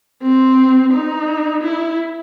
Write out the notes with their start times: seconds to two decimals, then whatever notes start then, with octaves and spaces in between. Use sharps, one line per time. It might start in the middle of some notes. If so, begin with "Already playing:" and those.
0.22 C4
0.92 D#4
1.63 E4